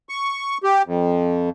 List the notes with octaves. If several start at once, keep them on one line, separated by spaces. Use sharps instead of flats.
C#6
G4
F2